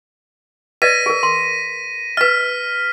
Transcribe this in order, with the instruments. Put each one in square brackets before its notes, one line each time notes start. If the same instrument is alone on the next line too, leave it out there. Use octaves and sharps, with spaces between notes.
[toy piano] B4 D5 D#5 [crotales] A#6 B6 D#7
[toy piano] G#4 A#4
C6
[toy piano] B4 D#5 [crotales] F6 B6